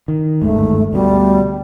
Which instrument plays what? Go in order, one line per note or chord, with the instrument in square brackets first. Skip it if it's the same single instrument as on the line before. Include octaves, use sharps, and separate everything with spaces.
[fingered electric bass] D#3
[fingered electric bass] G1 D#2 G#2 [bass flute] A3
[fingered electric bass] D2 B2 [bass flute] G3